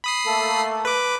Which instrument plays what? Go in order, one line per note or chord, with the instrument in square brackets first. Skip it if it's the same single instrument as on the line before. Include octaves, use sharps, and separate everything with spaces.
[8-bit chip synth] B5 D#6 C7
[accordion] A3 A#3 A4
[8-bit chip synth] B4 D6